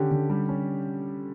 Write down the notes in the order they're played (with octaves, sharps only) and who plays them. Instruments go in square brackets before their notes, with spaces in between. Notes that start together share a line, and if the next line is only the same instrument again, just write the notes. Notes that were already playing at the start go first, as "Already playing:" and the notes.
Already playing: [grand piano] D3 C#4 [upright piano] G4
[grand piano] D3
G3
C#4